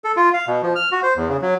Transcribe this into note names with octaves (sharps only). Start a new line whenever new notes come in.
A4
F4
F5
B2
F3
F6
F#4
C5
E2
C#3
F#3